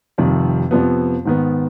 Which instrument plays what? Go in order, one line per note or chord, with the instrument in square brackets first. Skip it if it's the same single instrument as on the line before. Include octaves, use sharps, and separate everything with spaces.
[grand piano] F1 F2 C3 D#3 G3
F2 C3 F3 B3
G#2 D#3 B3